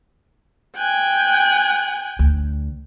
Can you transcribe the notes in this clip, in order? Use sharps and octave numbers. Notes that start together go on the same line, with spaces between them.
G5 G#5 F#6
D2